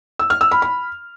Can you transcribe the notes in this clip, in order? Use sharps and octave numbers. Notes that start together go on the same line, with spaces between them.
E6
F6
E6
B5
B5